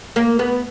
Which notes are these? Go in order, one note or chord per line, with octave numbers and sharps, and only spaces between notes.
A#3
B3